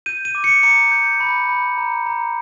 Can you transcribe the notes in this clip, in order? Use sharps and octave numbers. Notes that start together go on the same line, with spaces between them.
G6 D#7
D#7
D6
C#7
A#5 C#7
G6
B5
B5
A#5
A#5